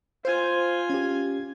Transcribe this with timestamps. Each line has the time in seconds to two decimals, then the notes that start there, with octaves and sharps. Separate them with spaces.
0.25 F4 C5 G#5
0.90 C#4 G4 G#6